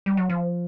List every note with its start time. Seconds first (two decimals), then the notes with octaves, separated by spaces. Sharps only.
0.06 G3
0.17 F#3
0.30 F3